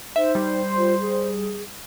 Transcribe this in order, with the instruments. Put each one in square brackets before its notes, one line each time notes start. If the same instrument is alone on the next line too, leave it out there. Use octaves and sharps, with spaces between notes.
[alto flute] D#4 [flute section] C5 [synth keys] E5
[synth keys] G3
[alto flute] F4
G#4